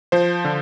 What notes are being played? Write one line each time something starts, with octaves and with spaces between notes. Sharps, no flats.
F3 C5
D3